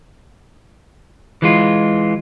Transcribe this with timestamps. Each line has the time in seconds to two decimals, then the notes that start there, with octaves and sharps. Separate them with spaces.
1.42 E3 G#3 F4